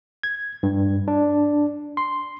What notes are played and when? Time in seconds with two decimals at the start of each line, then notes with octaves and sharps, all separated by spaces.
0.23 G#6
0.63 G2
1.08 D4
1.97 C6